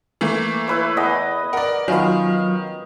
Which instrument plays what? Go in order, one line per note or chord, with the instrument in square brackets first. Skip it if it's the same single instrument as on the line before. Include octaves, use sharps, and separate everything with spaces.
[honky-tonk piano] E3 A3 A#3
[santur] E4 B4 C#5
[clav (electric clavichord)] E2 [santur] D#5 D6
[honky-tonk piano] A#4 D5 [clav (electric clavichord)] F#5
[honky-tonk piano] D#3 [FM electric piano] F#3 F4 F5 [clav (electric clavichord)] B3 C#4